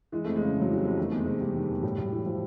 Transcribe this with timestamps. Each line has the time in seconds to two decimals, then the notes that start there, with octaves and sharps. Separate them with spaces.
0.12 E3 G#3
0.25 F2 A3
0.36 G#3
0.42 C#3
0.56 F2
0.61 F#3
0.70 E3 G3
0.84 F2 G#3
0.98 D#3 A3
1.12 E2
1.19 G#3
1.26 C3
1.40 E2 G3
1.55 D#3
1.69 E2
1.83 A2 G3
1.98 A2
2.05 F#3
2.12 E3
2.25 E3 F3